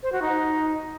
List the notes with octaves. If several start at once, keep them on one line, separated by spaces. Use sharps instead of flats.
C5
F#4
D#4